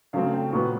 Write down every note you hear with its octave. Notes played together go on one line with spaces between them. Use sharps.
C#3 F#3 A3 C4 F5
G5
A#2 F#3 B3 C#6